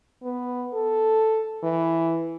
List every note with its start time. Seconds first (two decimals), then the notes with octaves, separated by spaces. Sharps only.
0.23 B3
0.74 A4
1.63 E3